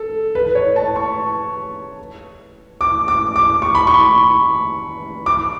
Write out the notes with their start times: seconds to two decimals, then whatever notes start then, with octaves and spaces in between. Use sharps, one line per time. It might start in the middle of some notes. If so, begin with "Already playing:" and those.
Already playing: A4
0.35 B4
0.55 C#5
0.76 A5
0.96 C#6
2.81 D6
3.08 D6
3.36 D6
3.62 C#6
3.75 B5
3.87 C#6
5.26 D6